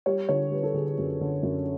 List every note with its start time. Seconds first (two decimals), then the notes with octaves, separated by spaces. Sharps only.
0.06 G3 C#5
0.29 D3 C#5
0.51 G3 B4
0.63 A4
0.74 D3 G#4
0.86 G#4
0.98 F#2 G#4
1.21 D3
1.43 F#2